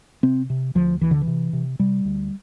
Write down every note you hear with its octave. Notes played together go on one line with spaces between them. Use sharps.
C3 C4
C3
D2 F3
D2 E3
D3
E3
C3
C3
C3 G3
D2